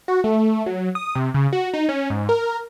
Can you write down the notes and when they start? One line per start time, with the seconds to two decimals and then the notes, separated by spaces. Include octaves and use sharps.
0.08 F#4
0.24 A3
0.66 F#3
0.95 D#6
1.15 C3
1.34 C#3
1.53 F#4
1.74 D#4
1.89 C#4
2.10 G#2
2.29 A#4